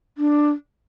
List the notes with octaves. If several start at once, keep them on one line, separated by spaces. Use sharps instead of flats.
D4